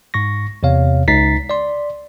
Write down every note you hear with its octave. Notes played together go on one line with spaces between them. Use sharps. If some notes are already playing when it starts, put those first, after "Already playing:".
G#2 C#6 A#6
E2 C3 C#5 F5
C#2 D#4 A#5 A6 B6 C7
D5 C6